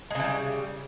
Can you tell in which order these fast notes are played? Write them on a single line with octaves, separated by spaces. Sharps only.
G#3 C#3 E3 G3